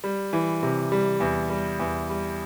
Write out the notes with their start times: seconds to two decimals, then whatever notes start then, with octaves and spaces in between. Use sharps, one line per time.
0.04 G3
0.33 E3
0.63 C3
0.92 G3
1.20 E2
1.50 G3
1.79 E2
2.10 G3